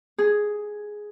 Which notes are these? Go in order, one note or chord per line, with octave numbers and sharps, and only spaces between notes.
G#4